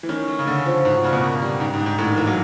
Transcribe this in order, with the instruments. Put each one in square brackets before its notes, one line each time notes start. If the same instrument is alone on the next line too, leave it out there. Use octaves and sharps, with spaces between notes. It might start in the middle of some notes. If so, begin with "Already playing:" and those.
[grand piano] E3
[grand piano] D#3 [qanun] C#4
[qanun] A3
[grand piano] C#3
[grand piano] D3 [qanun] C#4
[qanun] F3
[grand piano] G#2 [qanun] F#4
[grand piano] C#3 [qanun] D4
[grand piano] B2
[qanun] A#3
G3
[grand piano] G#2 [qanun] D4
[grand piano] G#2
[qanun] D4
[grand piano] G#2
[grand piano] A2 [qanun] D4
[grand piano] D#3
[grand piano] E3 [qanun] A#3
[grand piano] F#3